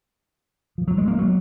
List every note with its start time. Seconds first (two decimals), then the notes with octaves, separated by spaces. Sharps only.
0.78 F3
0.88 F#3
0.98 G#3
1.08 A#3
1.19 F#3